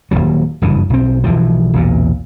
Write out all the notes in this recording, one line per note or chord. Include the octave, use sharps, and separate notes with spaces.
D#1 A#1 D#2 F#3
F#1 D2 G2 E3
B1 C4
B1 E3 F3
B1 E2 A#2